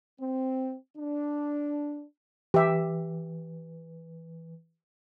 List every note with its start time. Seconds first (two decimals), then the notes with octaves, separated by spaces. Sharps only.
0.21 C4
0.98 D4
2.54 E3 G4 E5